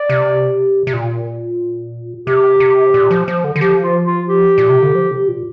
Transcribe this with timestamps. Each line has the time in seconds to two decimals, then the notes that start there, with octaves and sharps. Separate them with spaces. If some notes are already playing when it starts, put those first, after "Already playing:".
Already playing: D5
0.09 C3
0.87 C3
0.93 A#2
2.27 C3 G4
2.60 C3
2.94 A#2
3.11 F3
3.28 F3
3.44 D3
3.56 D3
3.61 F3 G4
3.83 F4
4.05 F4
4.27 G4
4.58 A#2
4.70 C3
4.82 D3
4.95 F3
5.11 C3
5.28 A#2